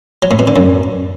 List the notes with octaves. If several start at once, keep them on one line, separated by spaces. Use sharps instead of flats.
F#3
A2
B2
D3
F#2